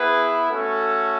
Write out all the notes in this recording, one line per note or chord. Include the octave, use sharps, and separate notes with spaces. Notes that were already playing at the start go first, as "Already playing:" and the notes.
Already playing: B3 E4 G#4 B4
A3 C#4 F#4 A4